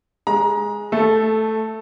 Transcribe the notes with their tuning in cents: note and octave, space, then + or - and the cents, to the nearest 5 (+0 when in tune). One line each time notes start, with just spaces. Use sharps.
G#3 +0 A#5 +25
A3 +0 A4 -15